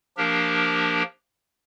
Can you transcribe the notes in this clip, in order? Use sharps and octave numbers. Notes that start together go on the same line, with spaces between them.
F3 A#3 D4 G4 A#4